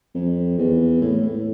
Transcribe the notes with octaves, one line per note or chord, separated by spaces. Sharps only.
F2
E2
A2
A2